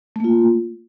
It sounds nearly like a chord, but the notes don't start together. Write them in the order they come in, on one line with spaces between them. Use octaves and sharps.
A3 A#3 F4